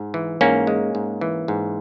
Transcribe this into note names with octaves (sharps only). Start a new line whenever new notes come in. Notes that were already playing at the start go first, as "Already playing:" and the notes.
Already playing: G#2
E3
G#2 A#3 C#4
G#3
G#2
E3
G#2